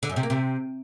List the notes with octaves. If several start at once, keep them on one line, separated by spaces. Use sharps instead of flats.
D3
F#2
C3
A#3
C3